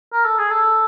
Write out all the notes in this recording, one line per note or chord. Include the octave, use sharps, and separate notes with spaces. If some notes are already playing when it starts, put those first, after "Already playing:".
A#4
A4
G#4
A4